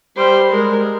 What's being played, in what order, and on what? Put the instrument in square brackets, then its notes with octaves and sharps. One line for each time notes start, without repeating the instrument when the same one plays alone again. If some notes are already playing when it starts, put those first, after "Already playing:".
[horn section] G3 [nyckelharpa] C5
[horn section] G#3 [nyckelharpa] A#4